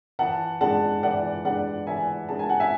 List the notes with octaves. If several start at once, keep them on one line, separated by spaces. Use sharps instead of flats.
E3 F#5 A5
G#3 D4 F#5 A5
E3 D5 F#5
G#3 D4 D5 F#5
E3 E5 G#5
G#3 D4 A5
G#5
F#5
E5 G#5